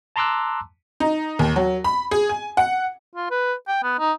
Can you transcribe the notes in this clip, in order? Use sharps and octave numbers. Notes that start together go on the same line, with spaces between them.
A5 A#5 C6 D6 E6 F#6
D#4
D#2
F#3
B5
G#4
G#5
F#5
F4
B4
G5
B3
D#4